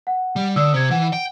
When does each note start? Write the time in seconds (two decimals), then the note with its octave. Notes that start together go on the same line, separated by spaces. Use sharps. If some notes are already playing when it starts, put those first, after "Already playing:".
0.07 F#5
0.36 G3
0.56 D3 D5 D#6 E6
0.74 C3 C5 G#6
0.91 E3 F#5
1.13 G5